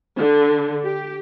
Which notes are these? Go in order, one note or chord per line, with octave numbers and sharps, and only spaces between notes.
D3
G4